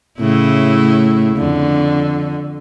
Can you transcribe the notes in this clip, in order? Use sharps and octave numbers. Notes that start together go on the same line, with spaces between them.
A2 C#3 E4
F2 D3